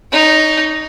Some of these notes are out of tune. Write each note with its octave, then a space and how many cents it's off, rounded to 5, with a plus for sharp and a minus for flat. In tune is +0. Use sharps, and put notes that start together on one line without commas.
D#4 +0 C#5 +30